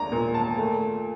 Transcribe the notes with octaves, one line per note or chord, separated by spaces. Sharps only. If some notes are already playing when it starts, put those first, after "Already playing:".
Already playing: D#2 D4 A#5
A#2
A5
A3